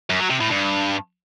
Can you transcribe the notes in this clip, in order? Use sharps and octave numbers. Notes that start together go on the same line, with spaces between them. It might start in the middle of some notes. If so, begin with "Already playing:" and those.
F#2
F#3
C3
A2
G2